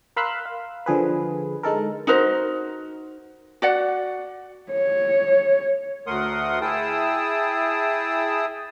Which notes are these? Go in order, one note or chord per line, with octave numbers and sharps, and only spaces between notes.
A#4 F5 B5 C6 E6 F#6
F5
D3 F3 G#4 B4
G#3 D#4 A4 A#4
D#4 F#4 A#4 C5
F#4 D5 F#5
C#5
D2 A3 A#4 F#5 C6 D#6
E4 G#4 G5 A5 D#6 E6